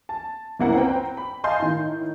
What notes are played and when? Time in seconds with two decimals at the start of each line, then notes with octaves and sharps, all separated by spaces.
0.09 A5
0.59 F#1 C#2 A#3 E4 F#5
0.75 C4 B4 G5 A#5
1.17 B5
1.44 D#5 F5 G#5 A5 C6 G6
1.59 A2 D#3